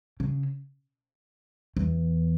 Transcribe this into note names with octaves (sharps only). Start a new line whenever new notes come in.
C#3
E2